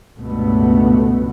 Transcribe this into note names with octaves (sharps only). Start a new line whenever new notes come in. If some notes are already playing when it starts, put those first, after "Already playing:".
C#2 G2 B2 A3 B3